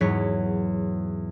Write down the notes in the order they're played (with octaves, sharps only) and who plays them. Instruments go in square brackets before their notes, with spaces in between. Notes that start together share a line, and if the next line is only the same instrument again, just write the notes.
[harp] E2 G#2 F#3 B3 C#5 B6